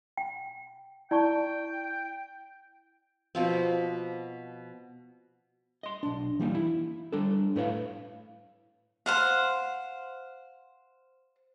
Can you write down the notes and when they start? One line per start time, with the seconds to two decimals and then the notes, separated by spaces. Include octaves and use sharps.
0.17 G5
1.11 E4 D5 G5 A5 C#6
3.35 B2 F3 C4
5.83 D#5 C6
6.03 B1 D4
6.40 E3 G3 A#3 D#4
6.55 E4
7.12 G3 D4 A4
7.56 A2 E4 B4 C#5 D#5 F5
9.06 C5 F5 F#5